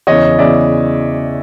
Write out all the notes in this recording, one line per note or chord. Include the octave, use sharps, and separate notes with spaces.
E2 C#3 E3 C#5 D#5
E2 C#3 E3 D5 E5